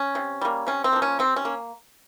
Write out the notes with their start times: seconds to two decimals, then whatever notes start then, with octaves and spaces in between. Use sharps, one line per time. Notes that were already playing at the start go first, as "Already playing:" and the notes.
Already playing: C#4
0.15 C3
0.41 G3 A#3
0.67 C3 C#4
0.84 C4
0.93 F3 A#3
1.02 C#4
1.19 C3 C4
1.36 C#4
1.45 A#3